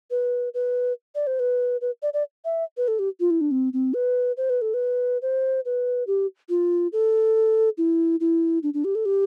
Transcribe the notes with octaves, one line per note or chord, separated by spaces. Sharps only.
B4
B4
D5
C5
B4
B4
D5
D5
E5
B4
A4
G4
F4
E4
D4
C4
C4
B4
C5
B4
A4
B4
C5
B4
G4
F4
A4
E4
E4
D4
D4
G4
A4
G4